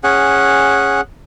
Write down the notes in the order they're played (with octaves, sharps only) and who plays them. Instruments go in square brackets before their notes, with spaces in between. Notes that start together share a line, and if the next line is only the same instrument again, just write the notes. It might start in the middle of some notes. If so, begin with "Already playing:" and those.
[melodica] C#4 G#4 F#5